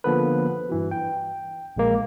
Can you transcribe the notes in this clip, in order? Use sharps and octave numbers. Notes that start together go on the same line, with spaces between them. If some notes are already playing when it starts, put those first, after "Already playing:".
D3 F3 A#3 B3 A4 B4
G2 E3 F#4
G5
A#1 G#3 A#3